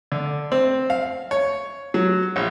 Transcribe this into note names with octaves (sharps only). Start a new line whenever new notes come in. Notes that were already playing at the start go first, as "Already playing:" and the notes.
D3
C4
F5
C#5
F#3
A#1